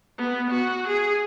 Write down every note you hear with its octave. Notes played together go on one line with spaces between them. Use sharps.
B3
F#4
G#4